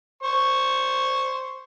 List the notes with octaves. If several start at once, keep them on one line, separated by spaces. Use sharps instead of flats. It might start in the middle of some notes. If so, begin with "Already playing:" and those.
C5 C#6